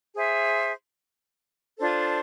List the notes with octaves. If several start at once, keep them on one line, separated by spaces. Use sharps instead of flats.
G#4 C5 E5
D4 F4 A4 C5